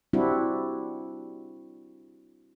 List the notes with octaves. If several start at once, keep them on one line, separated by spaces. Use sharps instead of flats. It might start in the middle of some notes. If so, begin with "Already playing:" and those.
G3 C4 D4 E4 F#4